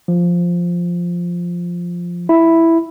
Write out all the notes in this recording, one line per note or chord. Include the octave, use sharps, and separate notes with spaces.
F3
E4